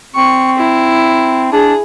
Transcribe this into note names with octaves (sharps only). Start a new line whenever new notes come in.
C4 C#6
E4
D4 G#4